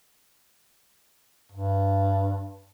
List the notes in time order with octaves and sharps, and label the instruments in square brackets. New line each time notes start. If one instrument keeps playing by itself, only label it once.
[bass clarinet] G2